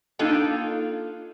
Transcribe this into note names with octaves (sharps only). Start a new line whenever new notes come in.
A#3 D4 D#4 F4 A4 G5